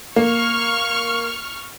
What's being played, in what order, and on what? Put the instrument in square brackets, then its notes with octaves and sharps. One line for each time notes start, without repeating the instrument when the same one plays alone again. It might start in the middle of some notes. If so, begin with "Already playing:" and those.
[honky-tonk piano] A#3 [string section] C#6 F6